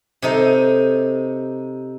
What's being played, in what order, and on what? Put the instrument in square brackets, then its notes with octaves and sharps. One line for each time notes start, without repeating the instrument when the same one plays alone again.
[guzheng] C3 D#4 A4